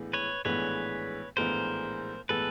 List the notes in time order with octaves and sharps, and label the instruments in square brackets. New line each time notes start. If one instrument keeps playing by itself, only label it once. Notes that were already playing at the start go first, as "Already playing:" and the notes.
Already playing: [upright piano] A#1 A2 E3 G#3 B3
[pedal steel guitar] B4 C#5
[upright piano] A#1 A2 E3 G#3 B3 [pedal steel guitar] B4 C#5
[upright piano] A#1 A2 E3 G#3 B3 [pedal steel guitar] A#4 C5
[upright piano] A2 E3 G#3 B3 [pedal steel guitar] A4 B4